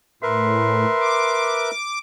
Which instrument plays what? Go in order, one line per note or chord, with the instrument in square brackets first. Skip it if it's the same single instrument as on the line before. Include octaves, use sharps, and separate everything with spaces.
[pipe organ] A2 [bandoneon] A#4 B4 E5 [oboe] C6
[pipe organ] D6